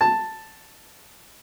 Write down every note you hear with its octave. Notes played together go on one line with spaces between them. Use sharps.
A5